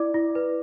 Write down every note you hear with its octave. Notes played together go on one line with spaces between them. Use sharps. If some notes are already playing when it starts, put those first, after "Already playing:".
Already playing: E4 D5 D6
E4
B4